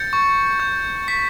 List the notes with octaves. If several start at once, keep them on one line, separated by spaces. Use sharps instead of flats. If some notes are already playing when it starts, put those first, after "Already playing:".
Already playing: G6 A6 C#7
C#6
G6
C#6 B6